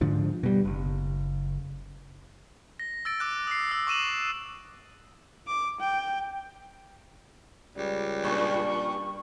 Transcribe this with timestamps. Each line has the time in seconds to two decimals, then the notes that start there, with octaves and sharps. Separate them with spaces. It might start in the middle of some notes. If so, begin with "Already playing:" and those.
0.01 G#2 D3 F3
0.43 B2 G3
0.65 F#1
2.80 A#6
3.05 E6 A6 D7
3.20 D6 F#6
3.47 D#6 C7
3.72 E6
3.87 C#6 D6 D#7 E7 F#7
5.47 D6
5.80 G5
7.76 C#2 G3
8.23 G2 A#2 C#6